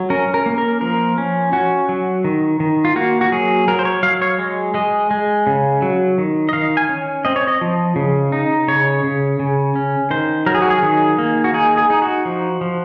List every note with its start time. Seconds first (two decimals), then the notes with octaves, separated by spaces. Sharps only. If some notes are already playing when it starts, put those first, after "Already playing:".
Already playing: F#3
0.10 C#4 A#4
0.34 A#4
0.46 A#3
0.58 A#4
0.81 F3 A#4
1.18 C#4
1.53 C#4 F#4
1.89 F#3
2.24 D#3
2.60 D#3
2.85 F4
2.96 A#3 F#4
3.21 F#4
3.32 F#3 G#4
3.68 F#3 A#4
3.79 C5
3.85 C#5
4.03 F#3 F5
4.22 C#5
4.39 G#3
4.74 G#3 D#5
5.11 G#3
5.47 C#3
5.82 F#3
6.18 D#3
6.49 D#5
6.53 D#3 F5
6.77 G#5
6.89 C#4
7.25 C4 D#5
7.36 C#5
7.47 D#5
7.61 F3
7.96 C#3
8.32 D#4
8.68 C#3 C#5
9.04 C#3
9.40 C#3
9.75 C#4
10.10 D#3 C5
10.46 F#3 A#4
10.55 G#4
10.62 F#4
10.70 G#4
10.83 D#3
11.18 A#3
11.44 F#4
11.54 D#4 G#4
11.78 G#4
11.90 D#4
12.02 F#4
12.25 F3
12.61 F3